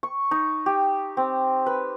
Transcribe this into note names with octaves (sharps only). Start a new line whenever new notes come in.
C#6
D#4
G4
C4
B4